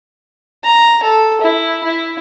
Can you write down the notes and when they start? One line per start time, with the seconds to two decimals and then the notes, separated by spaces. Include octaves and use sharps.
0.64 A#5
1.03 A4
1.41 E4
1.84 E4